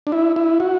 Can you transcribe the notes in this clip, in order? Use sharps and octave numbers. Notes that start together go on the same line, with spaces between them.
D4
E4
E4
F#4